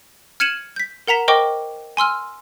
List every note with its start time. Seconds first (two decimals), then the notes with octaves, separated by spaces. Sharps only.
0.40 F6 G#6 C#7 D#7 E7 F#7
0.76 G6 B6
1.08 A#4 F#5 A#5 B6 E7
1.28 A#4 C5 D#5 G5 C#6 D6
1.97 G#5 C6 E6 F6